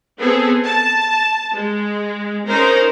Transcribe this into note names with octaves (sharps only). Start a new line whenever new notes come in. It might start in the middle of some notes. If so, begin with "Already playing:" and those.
B3 C4 G#4 A4
A5
G#3
C#4 D#4 A#4 C5 A#5